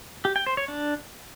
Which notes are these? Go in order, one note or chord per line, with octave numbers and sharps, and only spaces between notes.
G4
G5
C5
C#5
D4